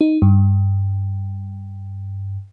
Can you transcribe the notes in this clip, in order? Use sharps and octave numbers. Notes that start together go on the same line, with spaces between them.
D#4
G2